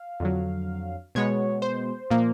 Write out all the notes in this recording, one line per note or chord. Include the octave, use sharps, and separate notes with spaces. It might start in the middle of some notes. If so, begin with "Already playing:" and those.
Already playing: F5
F2 D3 F#3
B2 G#3 B3 C#5
C5
A#2 F3 A#3